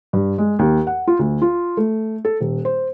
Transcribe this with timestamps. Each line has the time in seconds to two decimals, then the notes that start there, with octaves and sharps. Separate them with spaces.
0.13 G2
0.38 G#3
0.59 D#2
0.87 F#5
1.08 F4
1.19 D2
1.42 F4
1.77 A3
2.25 A4
2.41 D#1
2.65 C5